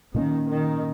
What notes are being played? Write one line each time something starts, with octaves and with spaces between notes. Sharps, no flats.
A#2 D#3 A#3 C#4
D#3